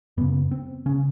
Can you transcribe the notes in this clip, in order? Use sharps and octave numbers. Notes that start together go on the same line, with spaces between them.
F#2 C#3 B3
C4
C#3 C#4